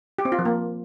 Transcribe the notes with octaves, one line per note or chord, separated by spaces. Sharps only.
G4
C4
F4
F3
A#3